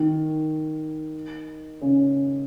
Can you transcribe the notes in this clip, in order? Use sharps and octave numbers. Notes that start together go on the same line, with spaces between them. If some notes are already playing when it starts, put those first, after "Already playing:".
Already playing: D#3
C#3